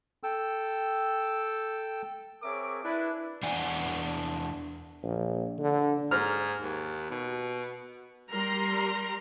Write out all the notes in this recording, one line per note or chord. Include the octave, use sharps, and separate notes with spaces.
A4 G5 E6
C4 G#4 A#4 C#5 E5 D6
D4 E4 B4
E2 D4 F#5 G#5
A#1
D3
G#2 F6
D#2
B2
G3 A#4 A#5 C6